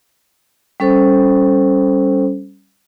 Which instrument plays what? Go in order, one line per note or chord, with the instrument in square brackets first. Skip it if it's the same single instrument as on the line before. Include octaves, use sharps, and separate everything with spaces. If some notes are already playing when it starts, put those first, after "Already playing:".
[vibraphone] G3 C#4 A4 C5